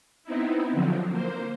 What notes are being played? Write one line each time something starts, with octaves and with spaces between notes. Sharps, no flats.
B3 C4 D#4 E4
D3 F3 F#3 C4
A#3 C5